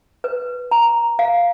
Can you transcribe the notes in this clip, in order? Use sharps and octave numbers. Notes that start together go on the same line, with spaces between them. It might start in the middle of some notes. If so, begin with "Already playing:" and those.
B4
A#5
F5